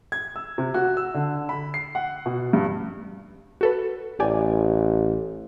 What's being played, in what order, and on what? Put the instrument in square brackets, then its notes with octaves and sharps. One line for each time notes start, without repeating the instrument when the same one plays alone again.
[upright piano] G#6
E6
C3
F#4
E6
D3
B5
C7
F#5
B2
G2
[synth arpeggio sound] F#4 A4 B4
[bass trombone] A1 [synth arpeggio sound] G4 D5 G#5